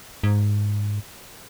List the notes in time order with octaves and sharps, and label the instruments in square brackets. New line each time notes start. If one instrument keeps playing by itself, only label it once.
[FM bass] G#2